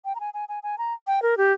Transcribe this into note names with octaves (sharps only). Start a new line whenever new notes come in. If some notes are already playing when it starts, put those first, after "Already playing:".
G5
A#5
G#5
G#5
G#5
G#5
A#5
G5
A#4
G4